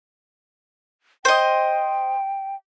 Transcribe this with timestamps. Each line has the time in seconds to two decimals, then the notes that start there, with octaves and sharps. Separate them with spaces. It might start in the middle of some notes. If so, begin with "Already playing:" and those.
1.25 C5 D#5 G5